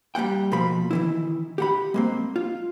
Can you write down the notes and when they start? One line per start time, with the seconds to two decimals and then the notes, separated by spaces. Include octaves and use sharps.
0.15 G3 A#3 F#5 G5
0.52 B2 F3 A#3 B5
0.91 D#3 E3 E4
1.58 G4 F#5 B5
1.94 G#3 A#3 C4
2.36 F4